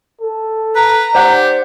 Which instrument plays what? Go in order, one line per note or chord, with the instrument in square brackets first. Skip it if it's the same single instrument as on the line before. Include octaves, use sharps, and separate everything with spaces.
[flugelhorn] A4
[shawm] B4 [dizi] A#5
[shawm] G4 [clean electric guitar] C5 F#5 [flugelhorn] D5